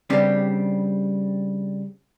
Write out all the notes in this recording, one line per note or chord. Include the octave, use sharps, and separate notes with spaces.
C#3 G3 B3 C4 D4 G4